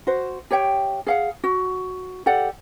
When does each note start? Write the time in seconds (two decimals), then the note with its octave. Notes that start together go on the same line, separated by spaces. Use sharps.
0.07 F#4 C5
0.51 G4 C#5 E5 G5
1.07 G#4 F5 F#5
1.44 F#4
2.26 G4 A4 D5 F#5